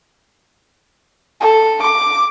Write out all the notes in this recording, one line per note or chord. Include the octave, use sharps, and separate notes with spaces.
A4
D6